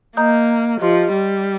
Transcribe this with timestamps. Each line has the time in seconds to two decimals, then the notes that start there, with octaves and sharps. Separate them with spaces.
0.17 A#3 D#5 A#5 D#6 G6
0.81 F3 G4 D#5 C6
1.13 G3